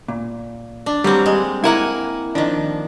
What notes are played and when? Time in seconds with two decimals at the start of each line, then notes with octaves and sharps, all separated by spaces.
0.08 A#2
0.86 D4
1.04 F#3 G3 A#3 C4
1.26 G#3
1.64 A#3 E4 A#4 F#5 G#5
2.35 D#3 F3 D4